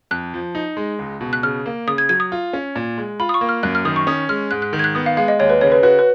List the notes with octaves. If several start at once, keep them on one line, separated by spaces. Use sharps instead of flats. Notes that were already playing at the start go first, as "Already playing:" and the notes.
F2 F#6
F3
D#4
G#3
C#2
B2
F#6
C#3 F6
A#3
C#3 D#6
G#6
F#3 G#6
D#6
F4
C#4
A#2
G#3
F4 B5
D#6
C#6
A#3
F6
F#2 F#6
F6
D#3 D#6
C#6
C#4 D#6
G#3 F6
G#2 F#6
F#6
D#3
G#6
F#6
B3 D#6
F5
G#3 F5
D#5
D#2 C#5
B4
C#3 C#5
B4
F#4 B4
B4